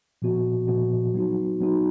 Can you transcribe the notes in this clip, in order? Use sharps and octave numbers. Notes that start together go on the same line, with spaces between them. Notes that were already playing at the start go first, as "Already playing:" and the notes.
A#2 F3 B3 F#4
A#2 F3 B3 F#4
F#3 B3 D#4 F#4
F#3 B3 D#4 F#4